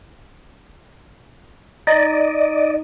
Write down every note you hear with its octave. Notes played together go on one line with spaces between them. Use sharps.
D#4 D5 D#5